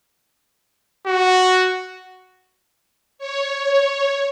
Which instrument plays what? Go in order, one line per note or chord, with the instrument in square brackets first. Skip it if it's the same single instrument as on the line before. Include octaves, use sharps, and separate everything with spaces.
[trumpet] F#4
[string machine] C#5